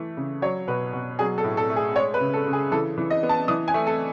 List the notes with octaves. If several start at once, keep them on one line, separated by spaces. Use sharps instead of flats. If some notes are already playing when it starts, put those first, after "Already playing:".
Already playing: E3 A3
C#3
F#3 C#5
B2 B4
B2
F#3 G#4
A4
A2
A4
A3
G#4
G#3 C#5
B4
C#3
A4
C#3
G#4
E3 A4
E3
D#5
B3
A5
E3 D#6
G#5
A3
A4